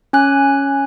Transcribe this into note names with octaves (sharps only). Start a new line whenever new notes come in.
C#4 G#5 F#6